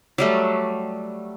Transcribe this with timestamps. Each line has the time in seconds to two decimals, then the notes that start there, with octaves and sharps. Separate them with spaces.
0.18 F#3 G3 A3